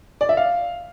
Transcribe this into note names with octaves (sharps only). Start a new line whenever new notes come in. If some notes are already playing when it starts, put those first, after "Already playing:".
D5
E5
F5